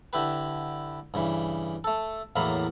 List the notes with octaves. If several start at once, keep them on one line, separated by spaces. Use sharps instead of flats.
D3 E4 G4 B4
G2 C#3 E3
A3 A4
E2 A2 F#3 A#3 F5 B5